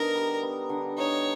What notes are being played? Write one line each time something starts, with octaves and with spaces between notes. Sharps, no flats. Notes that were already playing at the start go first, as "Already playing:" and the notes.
Already playing: D3 B3 D#4 A#4
G3
B3
D3
D#4 C#5